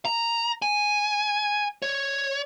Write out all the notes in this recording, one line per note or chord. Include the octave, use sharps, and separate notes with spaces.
A#5
G#5
C#5